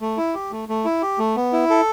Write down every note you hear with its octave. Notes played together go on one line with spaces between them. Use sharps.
A3
E4
G4
A3
A3
E4
G4
A3
B3
E4
A4